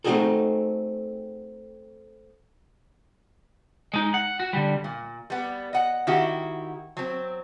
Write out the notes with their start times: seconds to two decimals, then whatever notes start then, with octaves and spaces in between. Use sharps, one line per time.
0.04 A3 C4 D#4 F#4 G#4 A4
3.94 G#3 D#4
4.14 F#5
4.40 F#4
4.53 D3 G3
4.84 A#2
5.30 G3 B3
5.73 D#5 F#5
6.07 D#3 E4 F#4 G4
6.97 F#3 C4